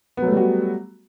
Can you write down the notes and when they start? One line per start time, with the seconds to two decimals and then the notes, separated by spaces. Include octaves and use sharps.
0.17 B3
0.22 F#3
0.27 A3
0.32 G3
0.37 F#4